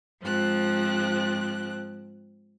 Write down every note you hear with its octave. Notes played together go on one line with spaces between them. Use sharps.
G#2 F3 C4 F#6